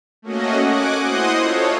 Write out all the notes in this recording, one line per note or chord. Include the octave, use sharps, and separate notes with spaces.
A3 A#3 C#4 F#4 D#5
F#5 G#5 D6 F#6
E4 C5 D#5 F#5 C6 D#6
F4 A4 C#5